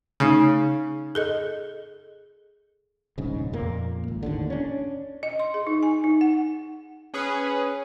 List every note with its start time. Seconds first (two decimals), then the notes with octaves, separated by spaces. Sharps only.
0.20 C#3 A3 D#4
1.15 G#4 A4 D#5
3.18 D#1 A#1 G#2 C#3
3.53 F2 A#2 A#3
4.08 G#1
4.23 D#2 A2 D3
4.50 C#4 D4
5.23 D#5
5.39 C6
5.54 G#4
5.67 D#4
5.83 G#5
6.04 D#4
6.21 F#5
7.14 C#4 G#4 B4